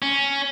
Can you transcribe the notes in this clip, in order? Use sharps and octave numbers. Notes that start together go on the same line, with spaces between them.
C#4